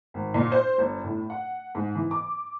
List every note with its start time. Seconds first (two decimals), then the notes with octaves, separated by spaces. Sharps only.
0.14 G#1
0.34 A#2
0.52 C5
0.78 G1
1.04 A2
1.30 F#5
1.75 G#2
1.95 E3
2.11 D6